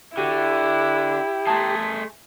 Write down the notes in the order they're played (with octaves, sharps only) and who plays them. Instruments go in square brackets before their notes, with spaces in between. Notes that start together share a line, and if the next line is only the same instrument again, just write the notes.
[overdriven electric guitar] D3 [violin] E4 [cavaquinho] F#4 [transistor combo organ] G4
[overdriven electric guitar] A3 G#4 [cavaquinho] A5 A#5 C6